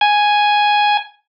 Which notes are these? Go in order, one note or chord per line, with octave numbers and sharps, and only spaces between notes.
G#5